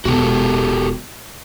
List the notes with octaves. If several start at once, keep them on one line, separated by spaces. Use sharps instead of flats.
E1 B2 F#4 G4 A4